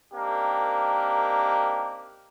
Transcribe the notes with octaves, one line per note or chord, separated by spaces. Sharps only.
A#3 C4 D4 D#4 G4 A#4